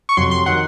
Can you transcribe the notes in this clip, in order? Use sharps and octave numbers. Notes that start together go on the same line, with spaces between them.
C#6
F2 C3 F#3 C6
C6
D#3 F#3 F#5